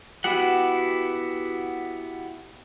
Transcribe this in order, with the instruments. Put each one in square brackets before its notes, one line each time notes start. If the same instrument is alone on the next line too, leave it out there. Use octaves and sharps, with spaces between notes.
[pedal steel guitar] B3 E4 F#4 G4 F#5